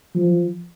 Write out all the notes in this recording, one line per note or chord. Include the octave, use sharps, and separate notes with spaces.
F3